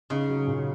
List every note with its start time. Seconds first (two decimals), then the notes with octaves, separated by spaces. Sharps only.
0.10 C#3 D#4
0.29 F#3
0.47 A#2